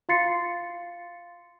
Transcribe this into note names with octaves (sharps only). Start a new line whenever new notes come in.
F4 F5 C6 A6 C7 C#7